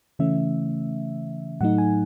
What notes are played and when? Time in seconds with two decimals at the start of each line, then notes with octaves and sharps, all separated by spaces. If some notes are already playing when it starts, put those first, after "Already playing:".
0.19 C#3 E3 A3 C#4 E5
1.61 A2 F#3 A3 D#4 F#5
1.78 G#5